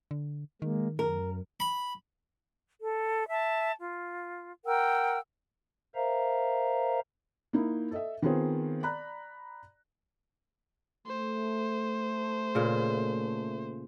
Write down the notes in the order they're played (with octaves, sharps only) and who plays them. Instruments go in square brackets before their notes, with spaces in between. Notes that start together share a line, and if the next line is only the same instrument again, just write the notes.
[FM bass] D3
[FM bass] D#3 [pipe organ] G#3 A#3
[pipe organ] F#2 [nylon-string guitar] A#4
[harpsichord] B5
[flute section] A4
E5 A5
F4
A#4 F#5 G5 E6
[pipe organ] A#4 C5 E5 F5 A#5
[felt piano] A#3 D#4 E4
A4 D#5 E5
D#3 B3 C4 F4 G#4 C5
D5 A#5 B5 F#6
[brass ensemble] A3 [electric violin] C5
[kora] A#2 C#3